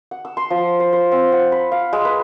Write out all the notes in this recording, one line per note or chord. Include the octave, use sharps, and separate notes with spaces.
F#5
E6
C6
F3
C5
C5
C4
F#5
B5
F5
G#3
B4